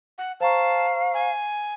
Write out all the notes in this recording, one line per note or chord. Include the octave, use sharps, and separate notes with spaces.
F#5
C5 F5 A5 A#5 C#6
G#5